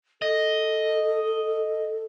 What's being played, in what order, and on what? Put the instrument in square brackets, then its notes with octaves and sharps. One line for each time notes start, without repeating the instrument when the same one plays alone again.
[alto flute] A4 [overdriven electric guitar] D#5